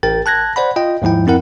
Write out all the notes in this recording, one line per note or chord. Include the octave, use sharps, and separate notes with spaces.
A1 A#4 G5 A6
A5 F#6 G#6 A#6
C5 D5 F#5 B5
F4 D#5 G5
D#2 G#2 F3 E4 G5
F2 C4 E4 A#4 F#5